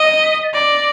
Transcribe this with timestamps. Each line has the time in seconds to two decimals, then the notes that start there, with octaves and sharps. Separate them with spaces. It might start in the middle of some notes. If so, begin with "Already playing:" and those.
Already playing: D#5 A#6
0.23 B6
0.44 A6
0.53 D5 A#6